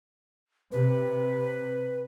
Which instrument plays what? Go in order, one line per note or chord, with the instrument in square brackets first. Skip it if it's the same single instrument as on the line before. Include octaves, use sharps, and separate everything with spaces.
[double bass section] C3 [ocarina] B4